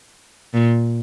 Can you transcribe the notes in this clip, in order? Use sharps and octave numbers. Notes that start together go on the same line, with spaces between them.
A#2